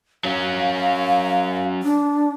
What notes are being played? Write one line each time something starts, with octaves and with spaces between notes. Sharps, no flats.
F#3 C#4 F5
D4